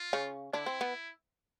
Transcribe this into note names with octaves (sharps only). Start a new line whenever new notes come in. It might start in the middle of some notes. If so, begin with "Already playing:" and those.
Already playing: F4
C#3 C#4
D3 D4 E4
C4
B3